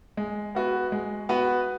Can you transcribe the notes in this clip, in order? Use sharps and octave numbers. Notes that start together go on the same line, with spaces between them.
G#3
B3 F#4 B4
G#3
B3 F#4 B4